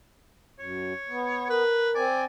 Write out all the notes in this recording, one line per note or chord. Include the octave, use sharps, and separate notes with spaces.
F#2 C#5
B3
A#4 B4
C4 D5 G#5